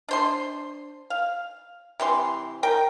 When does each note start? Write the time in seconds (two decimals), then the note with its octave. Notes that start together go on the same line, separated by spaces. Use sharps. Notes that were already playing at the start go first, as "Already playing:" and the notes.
0.09 D4 C5 C6
1.10 F5
2.00 C3 E3 C6
2.63 A#4 G5